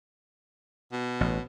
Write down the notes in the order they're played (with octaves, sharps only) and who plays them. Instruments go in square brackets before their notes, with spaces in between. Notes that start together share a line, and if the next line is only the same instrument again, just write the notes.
[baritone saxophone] B2
[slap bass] A1